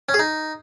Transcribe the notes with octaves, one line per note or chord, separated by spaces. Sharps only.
C#4
G#4
D#4